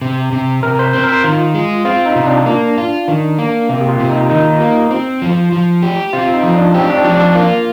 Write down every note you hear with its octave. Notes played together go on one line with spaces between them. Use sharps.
C3
C3
C3 A#4
C5
C4 C5
A#4
C5
D#3 F4
G#3
C4 F4
D#4
C3
D4
A#3
F4
D#3
A#3
C3 A#3
G4
F4
C3
D#4
D#3 D#4
A#3
C4
F3
F3
G4
C4 F4
D#4
F3
D4
C4 G4
D4
F3 D4
D4
A#3 F4